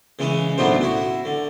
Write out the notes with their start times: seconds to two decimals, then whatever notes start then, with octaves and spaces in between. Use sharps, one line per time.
0.19 C#3 E3 G#3 C#4
0.58 B1 A2 F#3 B3 D4 C5
0.81 E4 F#4
1.25 D3